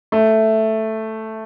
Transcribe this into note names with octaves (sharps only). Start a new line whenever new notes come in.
A3